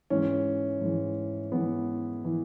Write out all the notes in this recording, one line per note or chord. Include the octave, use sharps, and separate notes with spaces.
G#2 E3 C#4
G#2 E3
G#2 E3 B3
E3